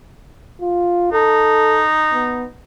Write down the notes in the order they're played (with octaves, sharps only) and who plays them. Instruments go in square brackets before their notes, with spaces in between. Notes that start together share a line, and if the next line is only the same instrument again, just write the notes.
[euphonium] F4
[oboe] D#4 [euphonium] A4
[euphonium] B3